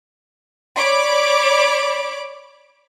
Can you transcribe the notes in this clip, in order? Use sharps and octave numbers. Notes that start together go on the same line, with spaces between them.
C#5 D5 B5 D6